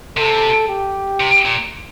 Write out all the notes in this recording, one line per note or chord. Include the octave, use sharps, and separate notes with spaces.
C3 A4
G4
C3
A#2